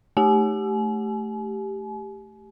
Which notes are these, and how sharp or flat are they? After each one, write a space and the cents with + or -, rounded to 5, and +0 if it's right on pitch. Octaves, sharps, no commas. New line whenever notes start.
A3 -5 G4 +0 G#5 +40